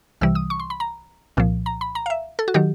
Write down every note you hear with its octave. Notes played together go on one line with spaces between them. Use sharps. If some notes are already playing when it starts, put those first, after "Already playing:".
C2 C3 E3 G3 E6
D#6
C#6
C6
B5
A#5
C2 A#2 F3
A#5
B5
A#5
F5
E5
A4
F#4
D#3 F#3 G4